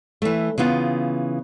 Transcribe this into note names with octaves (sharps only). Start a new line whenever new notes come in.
E3 A3
C#3 E3 B3 F4